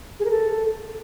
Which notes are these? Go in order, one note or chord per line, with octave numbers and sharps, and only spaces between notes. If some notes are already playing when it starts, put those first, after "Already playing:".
G#4
A#4
A4